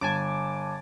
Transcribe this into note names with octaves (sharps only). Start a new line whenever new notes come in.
G1 G#5 A5 D6